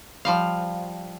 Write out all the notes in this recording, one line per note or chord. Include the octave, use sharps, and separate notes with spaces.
F3 G3 F5